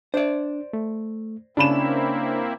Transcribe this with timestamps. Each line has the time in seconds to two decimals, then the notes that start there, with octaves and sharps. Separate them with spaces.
0.14 D4 C5 D5
0.73 A3
1.57 C#3 A#3 C4 D4 E4 C#5 B5 E7